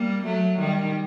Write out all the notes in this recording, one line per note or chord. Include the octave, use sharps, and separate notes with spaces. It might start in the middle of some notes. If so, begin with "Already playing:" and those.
Already playing: G3 A#3
F#3 A3
D#3 G3